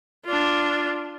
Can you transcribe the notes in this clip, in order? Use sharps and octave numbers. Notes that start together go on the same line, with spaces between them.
D4 F4